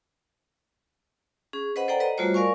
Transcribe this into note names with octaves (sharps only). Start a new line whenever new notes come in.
C#4 G#4
B4 C5 D#5 F#5 B5
A4 C5 D5 F#5 G5 A#5
B4 D#5 A#5
G3 A3 F4 F#4 C5 C#5
A#4 D5 F5 G#5 C#6